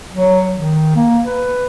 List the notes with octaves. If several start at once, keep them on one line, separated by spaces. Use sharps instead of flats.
F#3
D#3
A#3
B4